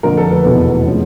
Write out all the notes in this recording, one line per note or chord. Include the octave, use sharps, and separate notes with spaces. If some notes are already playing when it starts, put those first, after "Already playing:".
F2 D3 F3 A#3 A#4
A4
B4
F1 E2 B2
C#3 F3